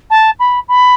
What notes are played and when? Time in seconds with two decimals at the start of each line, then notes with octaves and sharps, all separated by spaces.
0.10 A5
0.40 B5
0.68 B5